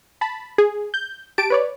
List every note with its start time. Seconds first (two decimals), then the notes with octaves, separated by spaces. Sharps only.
0.21 A5 B5
0.58 G#4
0.94 G6
1.38 G4 A5 D7
1.50 B4 C#5 D5